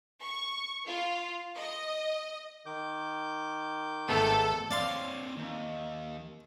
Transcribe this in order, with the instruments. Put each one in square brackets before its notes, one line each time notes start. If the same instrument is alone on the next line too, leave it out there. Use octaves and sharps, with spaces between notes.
[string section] C#6
F4
D#5
[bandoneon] D#3 D6 G6
[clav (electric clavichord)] G#1 A3 B3 [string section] A4
[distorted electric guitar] C4 C#5 [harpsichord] D5 F5 C6
[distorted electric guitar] D#2